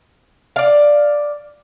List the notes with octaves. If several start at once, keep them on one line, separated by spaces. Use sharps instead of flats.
D5 F5